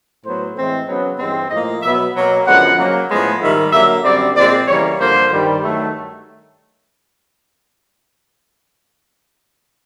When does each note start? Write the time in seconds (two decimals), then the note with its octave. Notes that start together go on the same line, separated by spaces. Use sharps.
0.24 A2 F#3 B3 C5
0.56 A2 E3 G#3 C4
0.88 C#3 F#3 B3
1.19 G2 E3 G#3 C4
1.51 A2 F3 A#3 D#5
1.82 B2 F#3 B3 E5
2.15 B2 F#3 A#3
2.46 F#2 D3 F3 G#3 B3 F#5
2.78 C#3 F#3 A#3
3.09 A2 F3 G#3 B3
3.41 G#2 D#3 G3 E5
3.73 D3 F#3 A#3 E5
4.04 F#2 D3 G3 C4 D5
4.36 A#2 F3 G#3 C4 D5
4.68 C#3 E3 G3 A#3 C#5
5.00 G2 D3 F3 A#3 C5
5.31 G2 D#3 G3
5.63 G2 D#3 F#3 A3